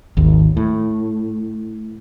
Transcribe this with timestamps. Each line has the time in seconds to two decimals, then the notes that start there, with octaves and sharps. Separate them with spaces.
0.17 G#1 D#2
0.57 A2